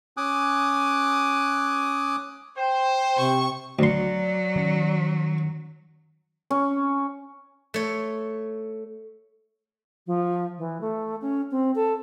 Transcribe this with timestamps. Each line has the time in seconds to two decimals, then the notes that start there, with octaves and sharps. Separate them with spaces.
0.17 C#4 G#5 D6 D#6 F#6
2.57 C5 G5
3.17 C3 C#6
3.79 D2 F#3 D5 C6
4.56 D#3 C#4
6.51 C#4
7.74 A3 C#5
10.07 F3
10.58 E3
10.81 A3
11.21 C#4
11.51 C4
11.75 A4